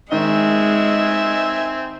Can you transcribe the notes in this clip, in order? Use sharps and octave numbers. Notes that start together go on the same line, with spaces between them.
D#3 G#3 C4 E5 G#5